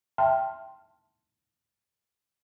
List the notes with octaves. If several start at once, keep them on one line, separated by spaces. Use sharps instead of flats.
E5 G5 A5 C6 F6